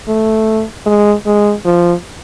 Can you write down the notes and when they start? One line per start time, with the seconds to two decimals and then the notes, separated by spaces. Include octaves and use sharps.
0.08 A3
0.86 G#3
1.26 G#3
1.65 F3